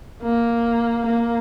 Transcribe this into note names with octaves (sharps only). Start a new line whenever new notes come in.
A#3
A#3